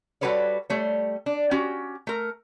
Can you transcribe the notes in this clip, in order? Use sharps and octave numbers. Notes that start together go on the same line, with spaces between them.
G3 F#4 A4 B4 C#5 D5
G3 A3 C#5
D4
C#4 F#4 G4
A3 A#4